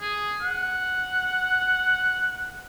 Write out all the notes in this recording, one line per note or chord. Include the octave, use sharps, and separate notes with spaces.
G#4
F#5